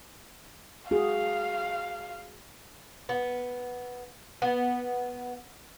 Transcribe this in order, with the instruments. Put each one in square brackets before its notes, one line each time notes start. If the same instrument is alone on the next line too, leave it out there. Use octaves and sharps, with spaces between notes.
[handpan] F#4 G#4 [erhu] F5
[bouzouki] B3
B3